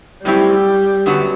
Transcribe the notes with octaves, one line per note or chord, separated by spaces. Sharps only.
A2 F#3 G3 C4 E4 G4
F#2 D3 F#3 B3 F#4